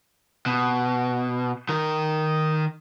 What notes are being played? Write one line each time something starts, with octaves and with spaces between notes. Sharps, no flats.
B2
D#3 A#4